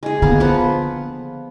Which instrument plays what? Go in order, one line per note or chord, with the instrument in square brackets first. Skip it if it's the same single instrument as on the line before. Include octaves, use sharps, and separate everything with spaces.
[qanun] G#3 G#4
[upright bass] D3 [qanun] A#3 B3
[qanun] F3 B4 F#5